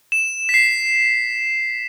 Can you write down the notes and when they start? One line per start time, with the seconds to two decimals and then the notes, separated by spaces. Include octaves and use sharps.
0.12 E7
0.49 B6
0.54 C7